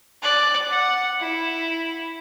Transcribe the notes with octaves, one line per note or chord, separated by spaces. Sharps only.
D5 F#6
F#5
E4